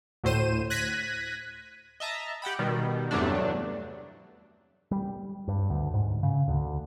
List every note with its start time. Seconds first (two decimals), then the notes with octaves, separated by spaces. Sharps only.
0.24 D2 A2 C5 D#7 E7
0.70 F#6 G#6 A#6 B6 D#7
2.00 D#5 E5 A5 A#5
2.42 G4 F#5 G5 B5
2.59 B2 D#3 G3
3.11 E2 G2 C3 F#3 A3 D4
4.91 G3
5.48 G2
5.70 D2
5.94 G#2
6.23 C#3
6.48 D2